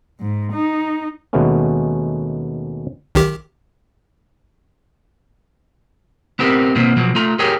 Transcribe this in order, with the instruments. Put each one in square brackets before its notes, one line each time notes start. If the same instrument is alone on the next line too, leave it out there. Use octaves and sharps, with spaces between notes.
[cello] G#2
D#4
[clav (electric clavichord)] D#2 B2 G#3 A3 B3 C#4
[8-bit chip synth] B1 D#3 G4
[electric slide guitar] B3 C4 G4 A#4
B2 E3 A#3 C4
B2 F3 F#3
A3 F4 A#5
G4 G#4 A#4 C#5 G5